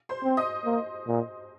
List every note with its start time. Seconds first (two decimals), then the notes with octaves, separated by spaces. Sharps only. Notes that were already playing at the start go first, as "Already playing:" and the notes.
0.09 C5 C6
0.24 C4
0.37 D#5 D#6
0.65 A#3
1.07 A#2